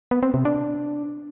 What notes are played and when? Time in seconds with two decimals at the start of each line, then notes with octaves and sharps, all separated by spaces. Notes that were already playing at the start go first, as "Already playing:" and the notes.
0.11 B3
0.23 C4
0.34 C3
0.45 D4